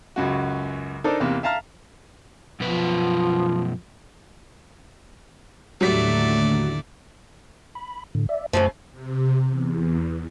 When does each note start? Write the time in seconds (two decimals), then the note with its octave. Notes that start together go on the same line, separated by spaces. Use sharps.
0.16 C#2 F#2 F#4
1.04 D4 D#4 A4 A#4 C5 D5
1.20 E2 C3 A#3
1.43 E5 F5 A5 A#5 F6
2.60 F#2 B2 F3 B4
5.81 D#2 A2 D3 F#3 G3 A3 D5 B6
7.75 B5
8.15 A2 D3
8.29 D5 E5
8.53 F#2 C#3 E3 F3 A3 C5
8.91 C3
9.49 E2